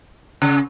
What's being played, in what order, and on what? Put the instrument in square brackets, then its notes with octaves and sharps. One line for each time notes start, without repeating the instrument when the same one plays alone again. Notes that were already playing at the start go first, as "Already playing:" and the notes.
[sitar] C#3